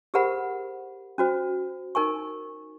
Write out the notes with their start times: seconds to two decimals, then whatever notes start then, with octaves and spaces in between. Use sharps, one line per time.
0.14 G4 G#4 A#4 C5 F#5 B5
1.18 C#4 F#4 C5
1.95 D#4 A#4 G#5 C#6